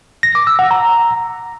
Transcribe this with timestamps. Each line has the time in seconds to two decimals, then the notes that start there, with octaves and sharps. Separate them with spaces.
0.23 A#6
0.35 D6
0.47 E6
0.59 F#5
0.71 A#5